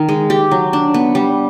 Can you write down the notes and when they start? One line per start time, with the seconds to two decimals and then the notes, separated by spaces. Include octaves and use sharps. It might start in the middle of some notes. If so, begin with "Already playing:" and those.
Already playing: D#3
0.09 G#3
0.30 G4
0.51 F#3
0.73 D4
0.94 B3
1.15 G3